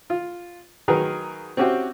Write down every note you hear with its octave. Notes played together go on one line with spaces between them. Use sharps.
F4
D#3 F#3 D#4 G#4 A#4 B4
C4 C#4 E4 F#4 G4 C5